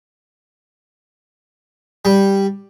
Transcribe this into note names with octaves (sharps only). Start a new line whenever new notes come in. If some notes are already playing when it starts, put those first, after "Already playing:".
G3